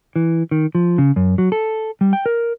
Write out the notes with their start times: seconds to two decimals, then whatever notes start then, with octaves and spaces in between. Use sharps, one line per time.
0.16 E3
0.51 D#3
0.75 F3
0.98 C#3
1.16 F#2
1.38 F#3
1.52 A4
2.01 G3
2.13 G5
2.26 A#4